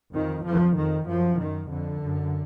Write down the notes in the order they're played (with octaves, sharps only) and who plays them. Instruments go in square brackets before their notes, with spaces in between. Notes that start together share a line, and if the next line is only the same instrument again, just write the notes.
[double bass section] F2 D#3
F2 F3
F2 D#3
F#2 F3
F#2 D#3
F2 D3
F#2